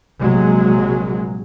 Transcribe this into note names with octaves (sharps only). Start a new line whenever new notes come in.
A#1 C3 F#3 G#3